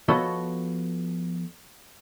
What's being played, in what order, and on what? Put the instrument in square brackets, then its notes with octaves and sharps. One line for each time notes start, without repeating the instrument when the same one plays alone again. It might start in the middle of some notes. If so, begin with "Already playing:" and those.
[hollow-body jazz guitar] F3 B3 F#4 A4 C#5 D#5